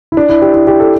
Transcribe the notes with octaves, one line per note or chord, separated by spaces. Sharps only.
E4
D4
E4
G4
E4
G4
A4